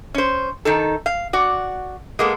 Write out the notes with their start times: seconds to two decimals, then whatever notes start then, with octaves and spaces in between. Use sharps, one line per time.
0.14 C#4 C5
0.65 D#3 D#4 A4
1.06 F5
1.33 F#4 D5
2.19 G#3 A#3 B3 A4